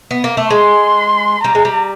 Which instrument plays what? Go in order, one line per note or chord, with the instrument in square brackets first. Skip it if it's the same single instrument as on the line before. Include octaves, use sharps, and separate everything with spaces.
[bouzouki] B3
A#3
A3
[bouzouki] G#3 [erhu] C6
[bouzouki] G3 [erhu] A#5
[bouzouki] G#3
G3